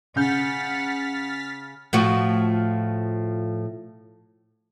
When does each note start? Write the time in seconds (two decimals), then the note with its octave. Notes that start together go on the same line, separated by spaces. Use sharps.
0.16 C#3 F#5 F6 G6 A6 B6
1.93 A2 F3 F#4